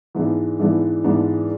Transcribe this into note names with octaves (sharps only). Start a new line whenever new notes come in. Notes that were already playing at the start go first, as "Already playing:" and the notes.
G#2 E3 G#3 B3 D4
G#2 E3 G#3 B3 D4
G#2 E3 G#3 B3 D4